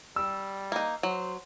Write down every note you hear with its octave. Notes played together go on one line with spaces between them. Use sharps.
G3 E6
A#3 D#4
F#3 C5